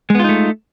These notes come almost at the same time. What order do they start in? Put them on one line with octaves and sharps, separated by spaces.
G#3 B3 F4 D#4 A3